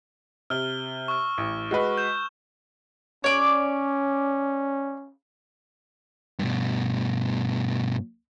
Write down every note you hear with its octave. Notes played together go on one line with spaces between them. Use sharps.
C3 F6 G7
C#6 E6 F6
A1
G#3 F#4 B4
G6 E7
C#4 C#5 D5
G2 B2